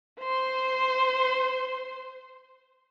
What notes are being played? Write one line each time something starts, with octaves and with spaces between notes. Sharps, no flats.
C5 C6